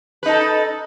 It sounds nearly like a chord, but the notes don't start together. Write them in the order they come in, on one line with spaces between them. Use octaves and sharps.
B4 D#4 A4